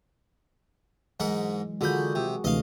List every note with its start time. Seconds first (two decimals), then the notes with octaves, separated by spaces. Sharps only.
1.20 G#2 E3 F#3 G#3 A#4 F#5
1.81 D3 F4 F#4 G#4 A#4 B5 G6
2.15 C3
2.44 D2 C3 E3 F3 A3 D4 D#5 F5